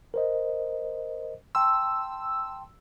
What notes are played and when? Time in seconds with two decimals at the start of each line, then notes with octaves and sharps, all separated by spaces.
0.14 A#4 C5 D#5
1.55 G5 A5 C6 E6